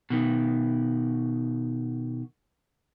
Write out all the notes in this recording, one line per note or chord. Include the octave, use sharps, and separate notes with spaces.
B2 D#3